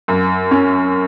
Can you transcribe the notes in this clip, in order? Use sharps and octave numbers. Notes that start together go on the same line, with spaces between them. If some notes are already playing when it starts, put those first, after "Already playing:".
F#2
C#4